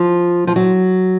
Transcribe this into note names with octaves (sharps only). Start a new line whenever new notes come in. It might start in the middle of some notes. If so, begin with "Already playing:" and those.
Already playing: F3
F3
F#3